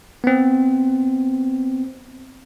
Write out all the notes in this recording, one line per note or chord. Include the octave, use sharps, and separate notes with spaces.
B3 C4